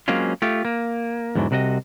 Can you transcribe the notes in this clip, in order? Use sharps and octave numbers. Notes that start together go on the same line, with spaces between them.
F#3 G#3 A#3 C4 C#4 F4
A3 F4 G4
A#3
E2 G#2 D3 E3 F#3
C2 C3 F#4 D5 D#5